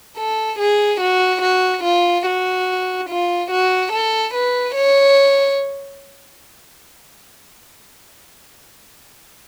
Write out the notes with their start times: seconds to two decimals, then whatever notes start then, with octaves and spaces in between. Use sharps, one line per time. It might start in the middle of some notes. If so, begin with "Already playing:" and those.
0.17 A4
0.59 G#4
1.01 F#4
1.42 F#4
1.84 F4
2.26 F#4
3.09 F4
3.51 F#4
3.92 A4
4.34 B4
4.76 C#5